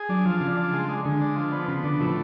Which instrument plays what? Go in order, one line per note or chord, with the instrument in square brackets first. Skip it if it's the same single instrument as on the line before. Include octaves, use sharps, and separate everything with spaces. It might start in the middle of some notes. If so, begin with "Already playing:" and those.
Already playing: [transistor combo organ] G#4
[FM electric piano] F#3 [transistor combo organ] D4
[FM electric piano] F3 [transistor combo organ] F4
[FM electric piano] C#3 [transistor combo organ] F4
[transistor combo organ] D4
G#3
G#3
[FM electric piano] D3 [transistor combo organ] G#3
[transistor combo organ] D4
F3
B3
[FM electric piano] C#3 [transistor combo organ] B3
[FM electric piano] D3 [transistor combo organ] D4
[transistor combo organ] A2 [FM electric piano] F3